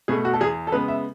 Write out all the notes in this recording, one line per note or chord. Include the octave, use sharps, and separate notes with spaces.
B2 A3 G#4
F#4
A4
E2 G#4
A4
C#3 G#3 B3 B4
E5